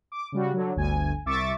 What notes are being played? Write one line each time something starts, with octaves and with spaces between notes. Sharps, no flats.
D6
C#3 G3 F#4
D3 F#3
G1 D2 G#5
C2 E5 C#6 D6 A6